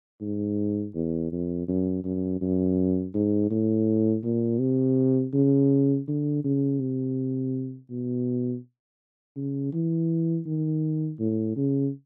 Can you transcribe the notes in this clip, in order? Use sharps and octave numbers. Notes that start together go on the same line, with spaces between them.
G#2
E2
F2
F#2
F#2
F#2
G#2
A2
A#2
C3
C#3
D3
C#3
C3
B2
C#3
E3
D#3
A2
C#3